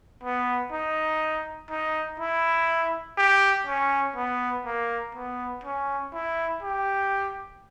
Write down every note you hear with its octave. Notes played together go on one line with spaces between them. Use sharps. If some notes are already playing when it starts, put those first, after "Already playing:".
B3
D#4
D#4
E4
G4
C#4
B3
A#3
B3
C#4
E4
G4